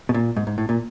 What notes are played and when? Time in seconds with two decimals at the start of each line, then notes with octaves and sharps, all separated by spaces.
0.09 B2
0.14 A#2
0.36 G#2
0.47 G#2
0.58 A2
0.69 A#2